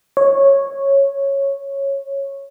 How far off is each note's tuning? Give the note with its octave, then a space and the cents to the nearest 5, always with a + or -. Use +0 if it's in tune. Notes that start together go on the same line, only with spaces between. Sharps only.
C#5 -10